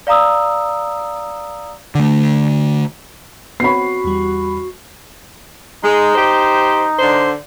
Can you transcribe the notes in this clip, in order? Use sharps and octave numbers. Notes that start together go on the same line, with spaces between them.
D5 F5 A#5 D#6 E6
D3 A3
B3 C4 F#4 C#5 B5 C7
E2 G3
G#3 D#4
G4 C5
D3 C5